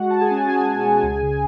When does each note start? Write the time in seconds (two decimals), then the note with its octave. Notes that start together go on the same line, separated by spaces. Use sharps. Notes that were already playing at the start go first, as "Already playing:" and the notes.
Already playing: G#3 F#4 F#5
0.10 G#3 A5
0.21 G#4 G#5
0.31 C#4
0.39 A5
0.48 C#4 G#4 G#5
0.67 B2
0.86 G#3
1.03 C#2
1.22 C#3